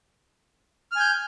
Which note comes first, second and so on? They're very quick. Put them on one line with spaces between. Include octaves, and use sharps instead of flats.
F6 G#5 G6